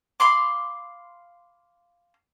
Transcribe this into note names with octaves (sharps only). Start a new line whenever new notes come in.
F5 B5 C6 D6